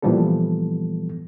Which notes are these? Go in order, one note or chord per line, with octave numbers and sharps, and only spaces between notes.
A#2 E3 F3 G3 B3 A4